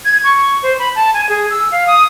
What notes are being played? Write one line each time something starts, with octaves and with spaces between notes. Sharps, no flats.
G#6
C#6
C5
B5
A5
G#5
G#4
E6
F5
D#6